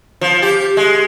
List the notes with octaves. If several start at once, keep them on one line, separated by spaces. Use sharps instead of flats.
F3
G4
G#3